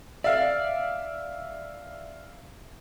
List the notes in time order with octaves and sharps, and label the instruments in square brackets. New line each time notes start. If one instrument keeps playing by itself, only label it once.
[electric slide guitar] D5 [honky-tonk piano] E5 F5